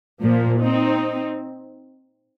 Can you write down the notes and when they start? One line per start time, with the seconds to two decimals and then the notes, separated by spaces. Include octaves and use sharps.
0.22 A#2 F3 A#3
0.62 C4 D#4